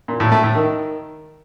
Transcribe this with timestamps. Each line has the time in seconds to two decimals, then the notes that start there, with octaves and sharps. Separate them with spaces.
0.08 A#2
0.20 A2
0.32 A3
0.43 A2
0.55 D#3